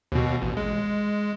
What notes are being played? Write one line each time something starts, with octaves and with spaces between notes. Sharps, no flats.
D#2 B2
A1
G#3